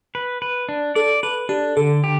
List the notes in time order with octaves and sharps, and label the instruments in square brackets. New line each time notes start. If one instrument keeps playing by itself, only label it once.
[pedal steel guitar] B4
B4
D4
[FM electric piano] A4 [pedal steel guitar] D5
[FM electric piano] A4 [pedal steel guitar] B4
[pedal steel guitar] D4 [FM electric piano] G4
[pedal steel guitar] D3 [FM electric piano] A4
[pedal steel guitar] G4